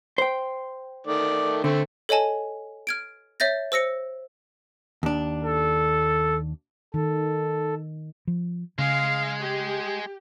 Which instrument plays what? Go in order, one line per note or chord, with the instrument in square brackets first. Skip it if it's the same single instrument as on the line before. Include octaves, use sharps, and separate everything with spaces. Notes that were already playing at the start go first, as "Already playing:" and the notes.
[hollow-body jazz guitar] C5 G5
[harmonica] D#3 A3 D5
[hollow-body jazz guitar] D3 [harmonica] A3 C4
[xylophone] A4 C#5 D#5 G#5 A5
F6 G#6 D7
C#5 E5 G6 A6 A#6
C5 E6 A#6 C#7
[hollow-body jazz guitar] D#2 D4
[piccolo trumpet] A4
[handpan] D#3 [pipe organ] A4
[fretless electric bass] F3
[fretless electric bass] C#3 [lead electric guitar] G#3 G#4 [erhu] F5
[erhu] G4